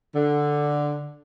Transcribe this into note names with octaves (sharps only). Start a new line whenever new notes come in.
D3